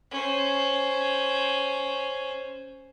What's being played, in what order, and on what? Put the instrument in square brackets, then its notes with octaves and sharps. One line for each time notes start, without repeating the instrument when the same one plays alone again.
[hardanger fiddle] C#4 C5